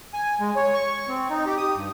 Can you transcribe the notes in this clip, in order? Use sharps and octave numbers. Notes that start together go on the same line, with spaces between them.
G#5
G#3
C#5
C#6
C4
D#4
G4
D#6
G2